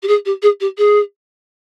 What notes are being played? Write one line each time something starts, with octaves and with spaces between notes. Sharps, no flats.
G4
G#4
G4
G#4
G4
G#4